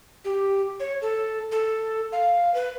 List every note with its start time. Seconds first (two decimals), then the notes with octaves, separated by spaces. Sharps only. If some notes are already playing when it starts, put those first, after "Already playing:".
0.25 G4
0.80 C#5
1.02 A4
1.52 A4
2.12 F5
2.54 B4